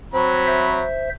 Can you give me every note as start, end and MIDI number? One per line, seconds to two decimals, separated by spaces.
0.14 0.84 54
0.14 0.82 60
0.14 0.84 83
0.47 1.10 72
0.47 1.10 76